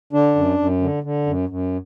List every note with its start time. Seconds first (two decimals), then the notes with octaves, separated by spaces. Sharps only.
0.13 D3 D4
0.35 F#2
0.59 F#2
0.82 D3
1.03 D3
1.26 F#2
1.49 F#2